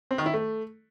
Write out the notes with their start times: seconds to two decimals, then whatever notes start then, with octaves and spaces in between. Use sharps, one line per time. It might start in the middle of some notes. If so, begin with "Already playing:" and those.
0.11 C4
0.18 D#3
0.26 E4
0.34 A3